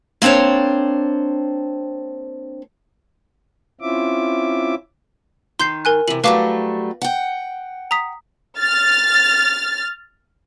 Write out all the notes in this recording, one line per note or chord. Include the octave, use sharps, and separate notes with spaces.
A#3 C4 D4 C5 C#5
C4 C#4 E4 F4 E5 D6
D#3 C6 G6 C7
A#4 G#5 F#6
C3 E3 F#7
F#3 G3 A3 B4 F5 D6
F#5 G5
A#5 D#6 B6
F6 A6